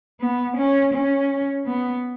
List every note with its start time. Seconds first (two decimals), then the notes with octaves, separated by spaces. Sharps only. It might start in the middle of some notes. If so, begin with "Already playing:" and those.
0.20 B3
0.57 C#4
0.94 C#4
1.66 B3